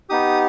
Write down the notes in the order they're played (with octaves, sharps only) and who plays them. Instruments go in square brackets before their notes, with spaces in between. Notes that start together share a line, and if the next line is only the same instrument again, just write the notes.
[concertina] B3 D#4 G4 D#6